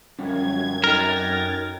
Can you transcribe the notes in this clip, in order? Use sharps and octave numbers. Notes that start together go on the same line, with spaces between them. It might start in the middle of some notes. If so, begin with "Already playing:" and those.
F#2 D3 F3 G3 C#4 G#6
D#4 A4 A#4 D#5 G5 F6 A6